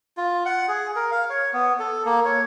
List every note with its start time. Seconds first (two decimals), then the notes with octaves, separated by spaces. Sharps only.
0.17 F4
0.45 F#5
0.68 G#4
0.96 A#4
1.11 F5
1.30 C#5
1.53 B3
1.80 A4
2.05 A#3
2.25 C#5